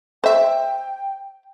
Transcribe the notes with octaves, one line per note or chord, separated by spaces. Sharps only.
C5 E5 G5